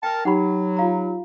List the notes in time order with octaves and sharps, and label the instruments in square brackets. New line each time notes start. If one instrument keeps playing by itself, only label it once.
[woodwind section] A#4 A5 [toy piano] G5
[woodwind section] F#3 [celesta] D#4 G4 B5 [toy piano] F#5
[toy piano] F4 F5 A#5